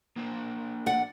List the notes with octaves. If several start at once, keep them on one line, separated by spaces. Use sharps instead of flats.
A#3 D4 C5
D5 F#5